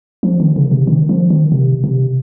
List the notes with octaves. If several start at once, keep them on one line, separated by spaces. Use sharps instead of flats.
F3
D#3
C#3
C3
D#3
F3
D#3
C3
C3